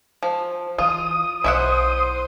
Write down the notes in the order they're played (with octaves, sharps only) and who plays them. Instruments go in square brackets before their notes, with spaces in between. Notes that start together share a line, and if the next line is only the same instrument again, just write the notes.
[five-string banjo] F3
[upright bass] E3 [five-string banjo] F4 [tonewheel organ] D#6
[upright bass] B1 [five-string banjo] E4 E5 F#5 [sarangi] C5